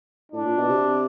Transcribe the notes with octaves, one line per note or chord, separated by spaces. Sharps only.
A2 D4
A#2
B2
C3